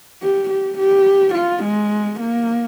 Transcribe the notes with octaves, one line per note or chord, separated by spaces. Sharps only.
G4
G4
G4
F4
G#3
A#3